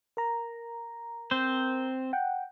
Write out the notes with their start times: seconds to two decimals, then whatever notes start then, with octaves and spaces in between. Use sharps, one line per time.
0.17 A#4 A#5
1.31 C4 C5
2.13 F#5 G5